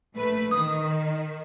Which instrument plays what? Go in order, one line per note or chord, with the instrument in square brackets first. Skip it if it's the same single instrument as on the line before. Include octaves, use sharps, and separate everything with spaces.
[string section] A#1 A3 B4
[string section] D#3 [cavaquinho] D#6